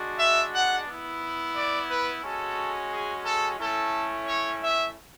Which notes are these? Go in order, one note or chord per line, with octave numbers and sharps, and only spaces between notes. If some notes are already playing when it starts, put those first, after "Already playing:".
Already playing: G#3 D4 F#4
E5
F#5
B3 E4
D5
B4
G#3 C#4 F#4 A4
G#4
A4
A3 C#4 E4 A4
C#5
E5